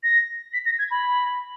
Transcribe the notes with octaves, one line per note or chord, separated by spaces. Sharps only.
A#6
B6
A#6
G#6
B5